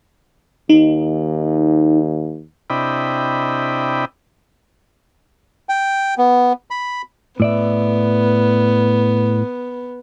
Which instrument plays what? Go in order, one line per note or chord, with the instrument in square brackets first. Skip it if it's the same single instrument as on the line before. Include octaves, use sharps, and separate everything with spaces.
[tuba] D#2 [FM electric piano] D#4
[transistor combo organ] C3 D4 E4 D#5 G5 B5
[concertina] G5
B3
B5
[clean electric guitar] A2 D5 E5 [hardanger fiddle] B3